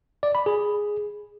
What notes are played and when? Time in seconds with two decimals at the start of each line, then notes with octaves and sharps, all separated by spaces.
0.23 D5
0.35 B5
0.46 G#4